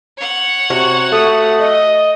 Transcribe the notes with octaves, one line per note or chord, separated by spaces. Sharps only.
C#5 F#5
C3 F#4
A3 D#6
D#5